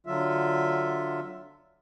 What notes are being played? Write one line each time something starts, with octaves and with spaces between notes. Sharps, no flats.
D3 F#3 F4 E5